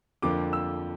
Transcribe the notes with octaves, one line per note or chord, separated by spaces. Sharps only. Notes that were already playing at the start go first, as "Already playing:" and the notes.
F2 D3 F3 A#3 D6
E6